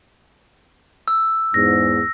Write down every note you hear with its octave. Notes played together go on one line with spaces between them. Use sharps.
E6
E2 G#2 A#6